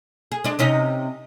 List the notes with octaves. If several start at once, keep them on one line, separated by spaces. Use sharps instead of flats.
G#4
G#3 D4
C3 C#4 D#4